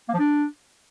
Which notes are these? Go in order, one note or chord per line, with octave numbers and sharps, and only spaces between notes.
A#3
F3
D4